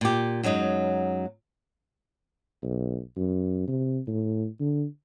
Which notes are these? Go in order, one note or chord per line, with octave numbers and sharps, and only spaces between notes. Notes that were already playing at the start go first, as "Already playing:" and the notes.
A#2 G4
F#2 F#3 G#3 D#4
B1
F#2
C3
A2
D3